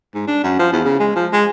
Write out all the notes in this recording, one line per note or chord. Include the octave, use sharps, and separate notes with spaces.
G#2
D4
F#2
F3
E2
C#3
G#3
F3
G#3